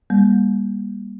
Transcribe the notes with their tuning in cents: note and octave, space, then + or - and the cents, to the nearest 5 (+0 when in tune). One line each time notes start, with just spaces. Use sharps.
G3 +35 A#3 +40